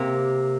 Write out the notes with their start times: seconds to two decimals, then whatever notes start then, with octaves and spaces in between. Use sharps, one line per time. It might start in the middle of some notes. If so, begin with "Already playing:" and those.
Already playing: C3 A#3 C4